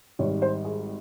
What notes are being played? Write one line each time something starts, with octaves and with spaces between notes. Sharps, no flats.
G#1 G#2 G3 C#5
C5
G#4